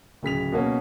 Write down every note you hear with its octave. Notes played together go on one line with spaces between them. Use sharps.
D1 C#3 B6 F7
B2 A#3 C#4